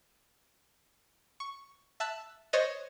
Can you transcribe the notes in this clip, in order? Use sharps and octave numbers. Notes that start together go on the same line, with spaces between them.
C#6
E5 A5 E6 F#6
C5 C#5 D#5 F#6 A6